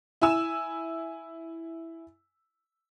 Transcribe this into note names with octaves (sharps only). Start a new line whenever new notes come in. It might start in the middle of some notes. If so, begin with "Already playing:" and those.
E4 G#5 E6 E7